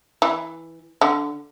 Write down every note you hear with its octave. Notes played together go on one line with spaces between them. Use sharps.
E3
D3